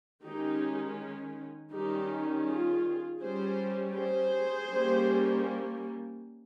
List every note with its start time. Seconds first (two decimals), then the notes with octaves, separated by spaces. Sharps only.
0.25 D#3 G#3 C#4 D#4 G4
1.73 D#3 G3 C#4 D#4 G4
2.47 F4 G#4
3.20 G3 C#4 G#4 C5
3.94 G#4 C5
4.69 G3 A#3 C#4